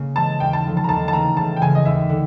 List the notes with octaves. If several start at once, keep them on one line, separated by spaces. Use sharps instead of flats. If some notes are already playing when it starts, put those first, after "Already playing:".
Already playing: C#3 A#3
E3 G#3 A5
D#2 G5
A5
D3 F3 A3
A5
A#5
D#2 A5
A5
C#3 E3 A3 A#5
C#2 A5
G5
C#3 E3 G#5
D#5
D#2 E5
D3